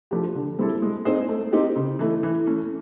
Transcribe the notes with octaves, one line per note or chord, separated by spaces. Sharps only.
F3 A3 D4 G4
D3
G3 C4 E4 A4
G#3
C4 D#4 G#4 C5
A3
C4 D#4 G4
C#3
E3 A3
E3
A3 C#4